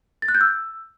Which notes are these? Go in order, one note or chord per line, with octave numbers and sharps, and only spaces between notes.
A6
F#6
G6
E6